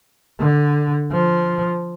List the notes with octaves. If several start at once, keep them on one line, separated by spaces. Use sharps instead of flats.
D3
F3